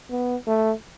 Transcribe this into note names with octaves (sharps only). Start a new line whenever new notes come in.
B3
A3